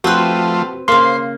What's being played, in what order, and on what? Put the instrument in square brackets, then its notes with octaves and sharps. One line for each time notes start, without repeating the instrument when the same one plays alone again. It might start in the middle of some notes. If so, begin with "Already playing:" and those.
[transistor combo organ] F3 A3 [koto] C4 B4 [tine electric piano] F#4
[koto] C#3 A#3 [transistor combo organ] C5 [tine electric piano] C6